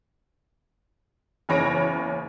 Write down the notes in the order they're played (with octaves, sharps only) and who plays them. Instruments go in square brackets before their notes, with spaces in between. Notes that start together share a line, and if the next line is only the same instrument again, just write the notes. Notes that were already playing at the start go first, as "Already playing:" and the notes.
[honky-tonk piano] F#1 E2 C#5 B5 A#6 D7